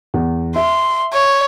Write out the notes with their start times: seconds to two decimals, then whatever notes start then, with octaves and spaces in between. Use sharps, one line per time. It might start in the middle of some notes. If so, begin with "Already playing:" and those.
0.14 E2
0.56 E5 C6
1.13 C#5